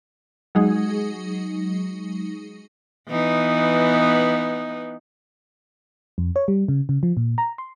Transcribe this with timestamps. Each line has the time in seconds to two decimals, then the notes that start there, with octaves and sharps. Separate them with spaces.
0.55 F#3 G#3 D#4 G#4
3.09 E3 B3 D#4
6.18 F2
6.36 C#5
6.48 G3
6.68 C#3
6.89 C#3
7.03 F3
7.17 A#2
7.38 A#5
7.58 C6